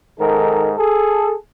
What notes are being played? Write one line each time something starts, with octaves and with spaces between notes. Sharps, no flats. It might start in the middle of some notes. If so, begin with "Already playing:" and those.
G#2 D#3 A4 A#4
G#4 A4